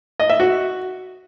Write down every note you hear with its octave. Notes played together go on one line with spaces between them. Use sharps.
D#5
E5
F#4